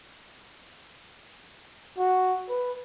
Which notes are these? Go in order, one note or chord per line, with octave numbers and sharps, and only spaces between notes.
F#4
B4